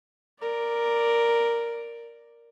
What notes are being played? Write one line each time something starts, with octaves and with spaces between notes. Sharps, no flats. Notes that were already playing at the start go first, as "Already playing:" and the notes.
A#4 D5